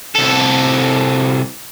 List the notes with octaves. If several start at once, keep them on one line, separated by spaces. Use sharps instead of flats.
C2 A4